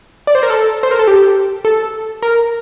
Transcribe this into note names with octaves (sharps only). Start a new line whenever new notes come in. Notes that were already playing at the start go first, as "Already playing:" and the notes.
D5
C5
A#4
A4
C5
A#4
A4
G4
A4
A#4